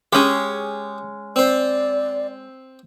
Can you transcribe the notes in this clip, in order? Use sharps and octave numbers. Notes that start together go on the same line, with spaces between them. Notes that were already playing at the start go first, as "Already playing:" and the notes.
G#3 C#4 G4 G#4
C4 C5 D5